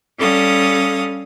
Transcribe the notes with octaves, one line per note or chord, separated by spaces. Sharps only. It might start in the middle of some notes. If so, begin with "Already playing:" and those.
G3 C#4 A4 F5 D#6